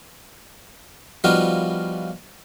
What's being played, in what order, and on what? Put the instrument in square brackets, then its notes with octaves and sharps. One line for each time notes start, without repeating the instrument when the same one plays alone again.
[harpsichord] F3 G3 B3 D#4 F4 F#4